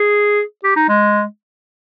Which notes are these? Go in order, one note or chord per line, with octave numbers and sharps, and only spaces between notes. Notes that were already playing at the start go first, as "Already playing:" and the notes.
Already playing: G#4
G4
D#4
G#3